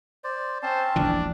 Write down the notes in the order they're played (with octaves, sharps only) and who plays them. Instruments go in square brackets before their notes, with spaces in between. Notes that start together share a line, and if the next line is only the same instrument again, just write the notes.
[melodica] C5 D5
[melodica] C4 C#4 A5 [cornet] C5
[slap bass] E1 A#1 E3 [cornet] D4